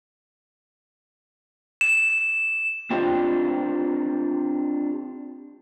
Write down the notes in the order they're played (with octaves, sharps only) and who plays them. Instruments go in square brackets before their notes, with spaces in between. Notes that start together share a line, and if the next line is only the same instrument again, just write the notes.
[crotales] E7
[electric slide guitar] C4 D4 F4 G4 C5